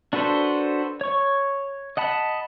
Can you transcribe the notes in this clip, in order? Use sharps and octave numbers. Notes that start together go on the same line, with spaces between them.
D4 F#4 A4 B4 C5
C#5 C#6
D#5 F#5 A5 B5